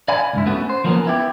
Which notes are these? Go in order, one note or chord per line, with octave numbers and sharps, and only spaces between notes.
D5 F5 G#5 B5
C#2 G2 E4
A3 B3 C#4 F#4
C5
F3 F#3 A#3 B3 C#4
B3 E4 G4